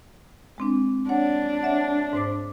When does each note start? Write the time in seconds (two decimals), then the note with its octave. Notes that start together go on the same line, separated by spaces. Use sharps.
0.58 G#3 C4 D4
1.09 D4 C#5 F#5
1.63 C#5 E5 F#5
2.13 G#2 C5 D6